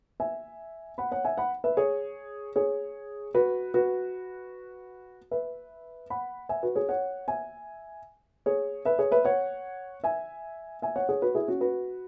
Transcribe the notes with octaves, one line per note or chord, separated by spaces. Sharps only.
E5 G#5
F#5 B5
C#5 F#5
E5 G#5
F#5 B5
B4 E5
G#4 C#5
G#4 C#5
F#4 B4
F#4 B4
B4 E5
F#5 B5
E5 G#5
F#4 B4
G#4 C#5
C#5 F#5
E5 G#5
G#4 C#5
B4 E5
G#4 C#5
B4 E5
C#5 F#5
E5 G#5
E5 G#5
C#5 F#5
G#4 C#5
F#4 B4
E4 G#4
C#4 F#4
F#4 B4